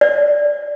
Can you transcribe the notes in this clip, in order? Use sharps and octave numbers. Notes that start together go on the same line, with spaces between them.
D5